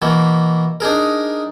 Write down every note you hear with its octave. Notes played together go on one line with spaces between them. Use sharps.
B2 E3 A#3
D4 D#4 G#4 A#4